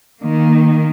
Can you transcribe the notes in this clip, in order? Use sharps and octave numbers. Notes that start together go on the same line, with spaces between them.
D#3 A#3